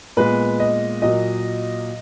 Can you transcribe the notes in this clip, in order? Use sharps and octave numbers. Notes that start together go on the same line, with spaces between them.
A#2 G#3 B3 B4
D#5
A#2 F#3 A#3 D#5